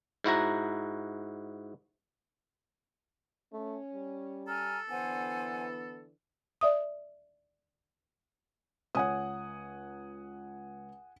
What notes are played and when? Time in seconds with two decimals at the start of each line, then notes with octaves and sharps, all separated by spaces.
0.24 G#2 E4 F#4 A#5
3.53 A3 C#4
3.94 G3
4.47 A4 G#5 A#5 F6
4.89 D3 E3 B3 C5 F#5 G#5
6.61 D5 E5 D#6
8.95 C#2 C#5 F#5 G#5 D#6